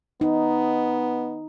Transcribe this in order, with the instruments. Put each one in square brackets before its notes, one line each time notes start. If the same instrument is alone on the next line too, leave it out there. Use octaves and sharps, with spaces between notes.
[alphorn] B3 [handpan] D#4